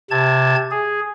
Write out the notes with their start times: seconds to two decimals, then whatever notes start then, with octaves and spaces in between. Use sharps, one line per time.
0.11 C3 A5 G#6
0.71 G#4